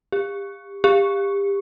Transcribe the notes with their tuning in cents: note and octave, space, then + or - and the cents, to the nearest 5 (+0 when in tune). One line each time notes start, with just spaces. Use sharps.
G4 +35
G4 +30